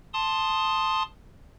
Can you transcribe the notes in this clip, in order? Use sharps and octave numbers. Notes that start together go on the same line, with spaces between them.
A5 C6 D#6